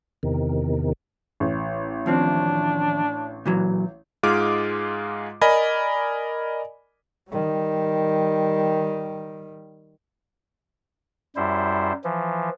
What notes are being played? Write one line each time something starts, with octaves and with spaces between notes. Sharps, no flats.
E2 C3 D#3
A1
D#2 F3 C4 D4
A#2 E3 F#3
G#2 G#3 F4 G#4 D6 F6
A#4 D5 D#5 G#5 B5
D#3 G3
F#2 G3 E4 C5
E3 F3